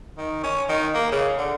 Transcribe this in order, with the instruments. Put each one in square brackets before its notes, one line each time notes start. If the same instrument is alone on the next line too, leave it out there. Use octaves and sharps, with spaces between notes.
[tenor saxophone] D#3
C#4
D#3
A#3
C#3
D3